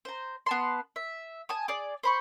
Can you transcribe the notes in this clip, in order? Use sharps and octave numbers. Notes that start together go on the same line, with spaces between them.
C5 A#5
B3 A5 C6
E5
G#5 A5 D#6
G#4 D5 D6
C5 B5 C#6